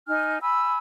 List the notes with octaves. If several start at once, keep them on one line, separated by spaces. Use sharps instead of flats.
D#4 G#5 F6
G#5 B5 E6